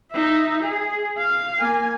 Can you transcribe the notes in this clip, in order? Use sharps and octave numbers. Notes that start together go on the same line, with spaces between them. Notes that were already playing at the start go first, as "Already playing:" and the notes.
D#4 E5
G#4
F5
A#3 G#5